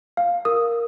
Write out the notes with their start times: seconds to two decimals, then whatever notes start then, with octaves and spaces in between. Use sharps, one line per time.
0.17 F5
0.45 A#4 D#6